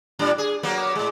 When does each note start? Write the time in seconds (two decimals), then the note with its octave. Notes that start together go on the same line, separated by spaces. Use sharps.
0.19 A2 G3 D4
0.38 G#4
0.63 F#3 A#3 B3
0.95 A2 G#3